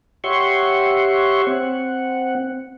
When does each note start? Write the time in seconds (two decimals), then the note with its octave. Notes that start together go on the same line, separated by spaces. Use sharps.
0.24 G4 C#5 E5 F#5 C6 C#6
1.47 C4 F#5